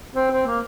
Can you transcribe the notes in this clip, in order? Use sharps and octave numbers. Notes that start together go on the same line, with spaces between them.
C4
C4
A#3